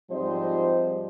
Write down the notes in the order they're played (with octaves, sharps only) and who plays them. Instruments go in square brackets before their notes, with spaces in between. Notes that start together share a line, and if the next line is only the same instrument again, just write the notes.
[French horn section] G#2 F3 G3 C4 C5 D#5